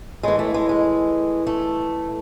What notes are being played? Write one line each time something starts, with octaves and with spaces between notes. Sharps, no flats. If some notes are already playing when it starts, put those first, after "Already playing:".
A2 E3 G#3
A3
G#3
G#3
A3